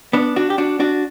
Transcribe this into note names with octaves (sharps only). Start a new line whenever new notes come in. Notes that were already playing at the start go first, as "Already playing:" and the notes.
B3 D4
D4 F#4
G4
D4 F#4
D4 F#4